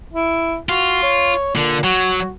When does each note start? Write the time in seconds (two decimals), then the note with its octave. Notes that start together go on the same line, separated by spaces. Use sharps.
0.14 E4
0.69 F4 F#4
1.03 C#5
1.56 A#2 D3
1.84 F#3 F#4